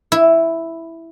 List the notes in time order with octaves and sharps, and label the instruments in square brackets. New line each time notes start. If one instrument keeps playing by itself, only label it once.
[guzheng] E4